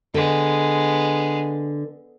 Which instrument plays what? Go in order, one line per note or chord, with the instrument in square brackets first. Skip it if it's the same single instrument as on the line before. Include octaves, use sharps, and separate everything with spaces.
[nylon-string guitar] D3 [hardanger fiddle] G#3 B3